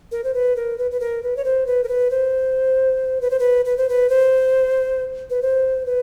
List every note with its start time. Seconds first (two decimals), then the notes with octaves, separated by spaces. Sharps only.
0.12 A#4
0.24 C5
0.34 B4
0.56 A#4
0.78 B4
0.91 B4
1.00 A#4
1.23 B4
1.37 C#5
1.44 C5
1.66 B4
1.84 A#4
1.88 B4
2.11 C5
3.21 B4
3.30 C5
3.39 B4
3.65 B4
3.77 C5
3.89 B4
4.09 C5
5.30 B4
5.42 C5
5.86 B4